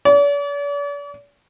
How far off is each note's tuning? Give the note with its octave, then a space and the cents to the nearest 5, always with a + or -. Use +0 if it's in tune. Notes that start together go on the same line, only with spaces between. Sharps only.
D5 -45